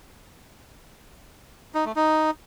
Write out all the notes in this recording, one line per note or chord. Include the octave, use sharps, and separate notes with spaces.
D#4
A3
D#4